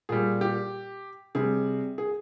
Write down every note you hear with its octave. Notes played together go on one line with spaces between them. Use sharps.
A#2 G3 G#4
G4
C3 G3 G#4
G#4